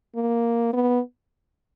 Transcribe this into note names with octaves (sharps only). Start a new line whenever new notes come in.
A#3
B3